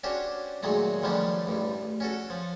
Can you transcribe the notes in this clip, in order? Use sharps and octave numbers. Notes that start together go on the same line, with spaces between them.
C#4 D4 F#4 G4 C5 C#5
A#2 D#3 F#3 G#3 A3
D3 D#3 F3 G3 C#4 D4
A1 G2
C#4 F#4 A4
F3